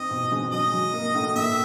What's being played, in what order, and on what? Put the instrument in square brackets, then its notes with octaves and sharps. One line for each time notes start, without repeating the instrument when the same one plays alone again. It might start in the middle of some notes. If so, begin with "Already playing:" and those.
Already playing: [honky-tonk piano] C4 D#4 [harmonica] D#5
[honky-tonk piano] B2
G#3
[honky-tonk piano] F#3 [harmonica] D#5
[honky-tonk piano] F#3
A#3
A2
[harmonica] D#5
[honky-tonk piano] A#2 [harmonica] E5